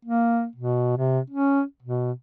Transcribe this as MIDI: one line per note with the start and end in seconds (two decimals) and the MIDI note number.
0.05 0.46 58
0.56 0.97 47
0.97 1.19 48
1.30 1.62 61
1.82 2.12 47